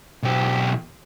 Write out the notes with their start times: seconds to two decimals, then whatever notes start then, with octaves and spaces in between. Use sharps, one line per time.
0.23 B1 G4